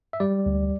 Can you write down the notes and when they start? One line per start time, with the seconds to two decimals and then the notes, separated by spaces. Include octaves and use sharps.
0.13 E5
0.20 G3 D5
0.46 D2